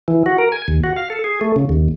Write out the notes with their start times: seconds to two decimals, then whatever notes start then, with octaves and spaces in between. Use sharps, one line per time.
0.08 E3
0.26 F#4
0.38 A#4
0.52 G#5
0.68 D#2
0.84 F#4
0.96 F5
1.10 A4
1.24 G#4
1.41 A3
1.56 C#3
1.69 D#2